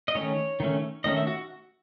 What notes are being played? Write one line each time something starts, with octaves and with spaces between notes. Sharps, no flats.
D#5
D#3 A3 C#4 C#5
D#3 A3 C#4
D#3 A3 C#4 D#5
E5
F#4